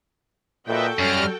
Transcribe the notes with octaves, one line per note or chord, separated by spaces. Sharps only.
A#2 F#4 A4 B4 D#5 E5 G5
F#2 G3 C#4 F6